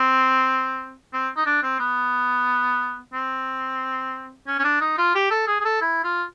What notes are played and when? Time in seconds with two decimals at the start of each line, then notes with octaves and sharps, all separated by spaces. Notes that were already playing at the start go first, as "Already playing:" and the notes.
Already playing: C4
1.13 C4
1.37 D#4
1.46 D4
1.63 C4
1.79 B3
3.14 C4
4.47 C#4
4.59 C#4
4.64 D4
4.81 D#4
4.98 F4
5.15 G4
5.31 A4
5.47 G#4
5.60 G#4
5.65 A4
5.81 E4
6.04 F4